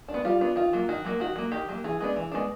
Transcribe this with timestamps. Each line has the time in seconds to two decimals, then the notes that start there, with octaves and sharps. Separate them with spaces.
0.08 D4
0.14 B3
0.25 G3 F4
0.41 B3 D4
0.56 D#3 F4
0.73 F#3 A#3
0.89 D#3 F#4
1.05 F#3 A#3
1.20 D#3 F#4
1.36 F#3 A#3
1.52 D#3 G4
1.69 F#3 A#3
1.84 E3 G#4
2.00 G#3 B3 D4
2.16 E3
2.31 G#3 B3 D4